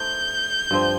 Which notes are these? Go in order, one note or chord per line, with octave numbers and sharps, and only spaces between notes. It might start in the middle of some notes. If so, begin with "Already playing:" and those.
Already playing: A3 D#4 A4 C5 G6
G2 F3 C4